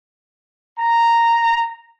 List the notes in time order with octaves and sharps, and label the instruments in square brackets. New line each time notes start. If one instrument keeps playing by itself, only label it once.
[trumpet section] A#5